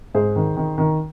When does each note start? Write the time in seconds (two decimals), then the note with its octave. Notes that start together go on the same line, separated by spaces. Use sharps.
0.14 G#2 G#4 C5
0.36 D#3
0.57 D#3
0.78 D#3